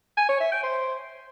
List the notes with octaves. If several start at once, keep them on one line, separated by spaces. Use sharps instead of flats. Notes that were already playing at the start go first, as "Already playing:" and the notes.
G#5
C#5
E5
G5
C5